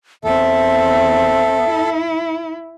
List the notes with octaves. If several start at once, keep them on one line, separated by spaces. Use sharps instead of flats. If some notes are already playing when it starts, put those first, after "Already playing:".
E2 C4 A4 E5
E4